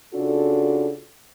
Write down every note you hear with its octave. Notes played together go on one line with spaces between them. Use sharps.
C#3 D4 F4 F#4 A4